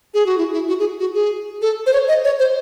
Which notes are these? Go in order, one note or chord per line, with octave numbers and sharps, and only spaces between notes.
G#4
F#4
E4
E4
F#4
G#4
F#4
G#4
A4
C5
C#5
D#5
C#5
C5